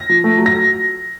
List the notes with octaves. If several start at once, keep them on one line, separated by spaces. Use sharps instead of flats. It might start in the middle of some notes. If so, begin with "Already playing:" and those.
Already playing: A#6
F3
A3
F#3
A#6